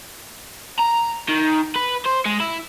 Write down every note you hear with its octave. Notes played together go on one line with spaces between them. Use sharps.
A#5
D#3
B4
C5
G#3
E4